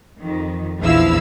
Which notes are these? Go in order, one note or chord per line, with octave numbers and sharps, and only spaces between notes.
F2 D#3
A#1 E2 F3 E4 F5 E6